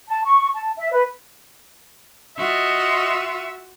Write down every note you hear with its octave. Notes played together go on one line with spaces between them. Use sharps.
A5
C#6
A5
E5
B4
F4 F#4 D#5 E5